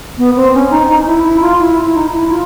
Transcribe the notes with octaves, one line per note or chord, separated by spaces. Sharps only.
B3
C4
C#4
D#4
D#4
E4
E4
F4
E4
E4
D#4
E4
F4